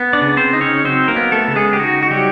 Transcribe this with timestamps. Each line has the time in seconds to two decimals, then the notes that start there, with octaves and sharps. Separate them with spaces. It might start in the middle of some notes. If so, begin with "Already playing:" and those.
Already playing: B3
0.13 D4 D5
0.21 C#3
0.37 C4 C5
0.53 D#4
0.61 C#4 C#5
0.85 F#3 C4 C5
1.08 A#3 A#4
1.16 B3
1.32 A3 A4
1.48 C#3
1.56 G#3 G#4
1.73 G4
1.79 D#4 F#4
2.03 F#4
2.11 F#3 G3 G4